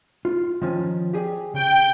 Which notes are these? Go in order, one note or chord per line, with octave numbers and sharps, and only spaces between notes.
F4
D#3 F3 C#4
G4 G#4 D5
C#3 G5